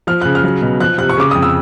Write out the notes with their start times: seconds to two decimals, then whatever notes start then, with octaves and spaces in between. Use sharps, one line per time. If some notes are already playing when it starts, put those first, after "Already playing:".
0.07 F3 F6
0.21 C#3 F#6
0.35 F6
0.43 F#3
0.62 B2
0.80 F3 F#6
0.98 C3 F#6
1.09 C#6
1.17 C#3 D6
1.31 F2 D#6
1.42 E6